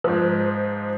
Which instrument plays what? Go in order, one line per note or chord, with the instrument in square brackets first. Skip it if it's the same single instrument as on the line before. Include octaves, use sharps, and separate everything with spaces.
[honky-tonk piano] G#2 F3